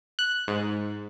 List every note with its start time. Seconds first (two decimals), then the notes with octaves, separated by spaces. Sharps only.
0.19 F#6
0.48 G#2